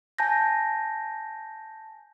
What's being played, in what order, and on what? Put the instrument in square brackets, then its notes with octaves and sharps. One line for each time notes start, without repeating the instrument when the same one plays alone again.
[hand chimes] G#5 A5 G6 A#6